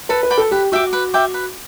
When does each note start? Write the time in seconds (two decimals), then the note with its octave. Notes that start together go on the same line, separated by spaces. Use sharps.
0.09 A4 B4
0.23 B4
0.31 D5 G5 B5
0.38 A4
0.51 G4 B4
0.72 F#4 E5 G5 D6
0.93 B4
1.14 E5 G5 D6
1.34 B4